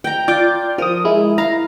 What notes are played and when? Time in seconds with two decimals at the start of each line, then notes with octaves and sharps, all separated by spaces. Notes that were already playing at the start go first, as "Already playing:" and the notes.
0.04 G5 A#5
0.28 F4 D5 D6 G6
0.78 F3 A#4 D#6
1.05 G#3 E4
1.38 E4 F5 A#5